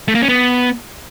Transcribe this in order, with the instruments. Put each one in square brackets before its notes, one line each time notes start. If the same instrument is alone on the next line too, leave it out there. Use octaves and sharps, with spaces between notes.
[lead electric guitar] A3
A#3
C#4
B3